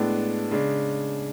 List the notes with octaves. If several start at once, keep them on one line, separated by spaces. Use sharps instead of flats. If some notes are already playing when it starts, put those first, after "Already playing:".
Already playing: A2 G#3 B3 D4
C#3 G#3 D4